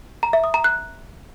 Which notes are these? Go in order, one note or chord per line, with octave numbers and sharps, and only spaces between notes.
A#5
E5
D#6
A#5
F#6